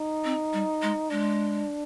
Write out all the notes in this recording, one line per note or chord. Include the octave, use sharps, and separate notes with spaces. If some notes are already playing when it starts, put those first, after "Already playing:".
Already playing: D#4
C4
G3
G#3
G#3 D4